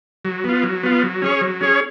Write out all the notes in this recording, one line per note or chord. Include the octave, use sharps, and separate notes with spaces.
F#3
B3 F4
F#3
B3 F4
F#3
C#4 G#4 C#5
F#3
C#4 G#4 C#5